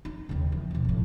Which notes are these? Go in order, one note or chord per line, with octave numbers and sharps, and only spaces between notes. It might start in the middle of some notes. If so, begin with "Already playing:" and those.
D#4
D#2 C#3
E3
D#2 B2
F2 A2